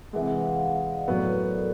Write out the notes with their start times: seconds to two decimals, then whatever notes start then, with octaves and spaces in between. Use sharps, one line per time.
0.13 C3 E3 G#3 F#5
0.29 F#5
0.45 F5
0.61 F5
0.73 E5
0.84 D#5
0.96 D5
1.07 A2 F#3 B3 D5
1.19 D5
1.32 A#4
1.43 A#4
1.55 A4